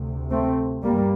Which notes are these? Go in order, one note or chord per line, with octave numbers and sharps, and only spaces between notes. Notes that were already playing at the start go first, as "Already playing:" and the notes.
Already playing: D2 C3
A3 C4
G2 G3 A#3